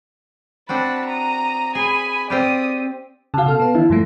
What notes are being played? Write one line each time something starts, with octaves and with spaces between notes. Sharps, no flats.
C4 D4 F#4 A5 B5
A#5 D#6
G#4 G#5 B5
C4 F4 G4 D5 D#6
C#3 F#4 F5 A5
B2 A4 F6
B3 B4
D#3 E3 E4
G2 F3 A3